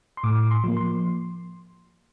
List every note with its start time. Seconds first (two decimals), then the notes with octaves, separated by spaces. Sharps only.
0.17 C6
0.23 A2 D6
0.51 C6
0.64 F3 A#3
0.77 C6